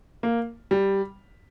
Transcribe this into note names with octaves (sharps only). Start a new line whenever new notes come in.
A#3
G3